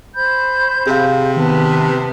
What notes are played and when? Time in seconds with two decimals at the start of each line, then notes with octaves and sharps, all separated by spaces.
0.15 C5 B5 G6
0.87 C3 G#4 F5
1.37 D#3 B3 B4 A5